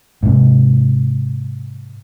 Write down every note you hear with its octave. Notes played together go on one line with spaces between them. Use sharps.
G#2 C3